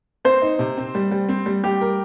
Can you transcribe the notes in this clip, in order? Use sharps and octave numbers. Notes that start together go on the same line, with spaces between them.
C4 C5
D#4
C3
C4
G3
G3
C4
G3
G3 G4
A#4